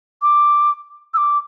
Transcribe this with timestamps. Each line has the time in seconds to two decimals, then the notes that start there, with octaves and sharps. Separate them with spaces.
0.22 D6
1.14 E6
1.17 D6